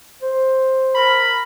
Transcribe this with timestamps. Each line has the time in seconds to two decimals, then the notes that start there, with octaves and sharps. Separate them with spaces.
0.22 C5
0.95 A#4 B5